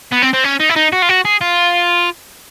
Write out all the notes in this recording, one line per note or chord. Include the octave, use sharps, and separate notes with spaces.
B3
C4
C4
C#4
D#4
E4
D#4
F#4
F4
F#4
G#4
F4